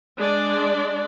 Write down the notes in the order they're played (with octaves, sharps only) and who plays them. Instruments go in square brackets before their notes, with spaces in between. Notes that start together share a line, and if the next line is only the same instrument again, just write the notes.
[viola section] G#3 D4 D5